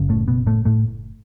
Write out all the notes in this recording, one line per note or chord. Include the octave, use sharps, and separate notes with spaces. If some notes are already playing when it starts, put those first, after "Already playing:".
Already playing: F#1 F#2 C#3
A2 A3
B2 B3
A2 A3
A2 A3